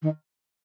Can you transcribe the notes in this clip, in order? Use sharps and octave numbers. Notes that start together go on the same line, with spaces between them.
D#3